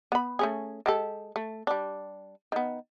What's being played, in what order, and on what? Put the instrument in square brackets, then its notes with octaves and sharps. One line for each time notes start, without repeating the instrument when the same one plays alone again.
[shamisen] B3 B5
A3 C#4 G#4
G#3 G4 A4
A3
G3 D4
D#3 B3